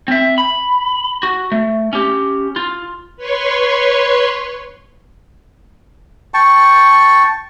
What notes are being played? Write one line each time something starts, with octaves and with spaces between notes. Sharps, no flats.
C4 E5
B5
F#4
A3
C#4 G4
F4
B4 C#5 C6 C#6
G5 A5 C#6